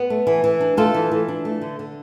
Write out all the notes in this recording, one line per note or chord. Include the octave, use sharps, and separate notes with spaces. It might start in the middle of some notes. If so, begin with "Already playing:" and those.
Already playing: B3
A3
E3
E3
D4
A3 F4 A4
E3
E3
D4
A3
D3
D3